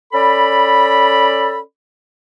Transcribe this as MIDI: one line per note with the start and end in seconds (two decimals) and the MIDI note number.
0.13 1.60 61
0.13 1.60 69
0.13 1.60 74
0.13 1.60 83